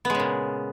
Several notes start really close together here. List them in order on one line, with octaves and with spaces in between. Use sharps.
B3 G#3 C#3 A#2